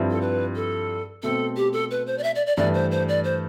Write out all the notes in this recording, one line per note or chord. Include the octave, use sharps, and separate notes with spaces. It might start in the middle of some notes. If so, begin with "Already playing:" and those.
Already playing: G2 F3 C4 E4
A4
B4
A4
B2 A3 C4 A4
G4
A4
B4
C5
D5
E5
D5
D5
G2 E3 A3 D5
C5
C5
D5
C5